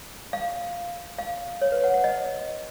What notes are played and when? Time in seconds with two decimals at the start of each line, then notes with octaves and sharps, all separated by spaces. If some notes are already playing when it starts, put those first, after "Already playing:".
0.33 F5
1.18 F5
1.61 C#5
1.72 B4
1.84 F#5
1.94 F#5
2.04 D#5